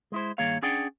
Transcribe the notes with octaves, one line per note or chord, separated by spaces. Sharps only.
G#3 E4 C5
G2 D#3 A#3 G#4 C#5 F5
C#4 D4 G#4 D5 F#5 G5